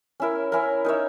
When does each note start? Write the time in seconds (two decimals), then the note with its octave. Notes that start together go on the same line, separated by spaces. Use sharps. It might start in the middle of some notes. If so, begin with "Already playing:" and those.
0.20 C#4 E4 A#4
0.52 C#4 E4 A#4
0.85 D#4 A#4 C#5 E5